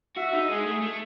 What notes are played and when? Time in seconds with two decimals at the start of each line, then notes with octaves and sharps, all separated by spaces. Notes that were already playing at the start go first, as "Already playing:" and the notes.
0.16 F#4 E5
0.33 D#4
0.49 G#3 G#4
0.66 A3
0.82 A3